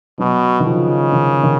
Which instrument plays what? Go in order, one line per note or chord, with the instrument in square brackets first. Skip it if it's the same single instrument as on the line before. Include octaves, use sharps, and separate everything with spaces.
[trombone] B2 [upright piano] F#3
[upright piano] D#3
[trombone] C#3 [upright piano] F3
[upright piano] D#3
D#3